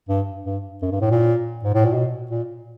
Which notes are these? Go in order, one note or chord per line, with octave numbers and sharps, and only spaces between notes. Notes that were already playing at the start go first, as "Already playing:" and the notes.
G2
G2
F#2
G2
A2
A#2
G#2
A2
A#2
B2
A#2